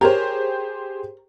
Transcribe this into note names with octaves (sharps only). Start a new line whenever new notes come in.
G4 G#4 A#4 C5 C#5 A#5